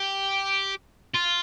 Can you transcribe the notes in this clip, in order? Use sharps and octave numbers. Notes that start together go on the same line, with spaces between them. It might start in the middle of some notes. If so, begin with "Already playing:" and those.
Already playing: G4
F4